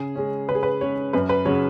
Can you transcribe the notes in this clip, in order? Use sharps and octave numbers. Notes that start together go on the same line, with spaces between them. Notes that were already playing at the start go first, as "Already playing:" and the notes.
Already playing: C#3 G#4
G#3 C#4
C#3 B4
G#4
B4
G#3 C#4 C#5
F#2 B4
B4
C#3 F#3 C#5